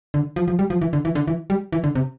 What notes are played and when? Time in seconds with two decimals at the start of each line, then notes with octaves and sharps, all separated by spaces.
0.14 D3
0.36 F3
0.48 F3
0.59 G3
0.70 F3
0.81 E3
0.93 D3
1.05 E3
1.15 D3
1.28 E3
1.50 G3
1.72 E3
1.84 D3
1.95 C3